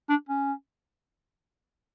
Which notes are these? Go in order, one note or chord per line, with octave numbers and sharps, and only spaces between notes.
D4
C#4